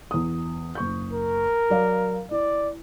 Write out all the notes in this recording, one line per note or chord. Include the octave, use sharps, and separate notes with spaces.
E2 D#6
F#1 C#6 G6
A#4
F#3 D5 F5
E4 D5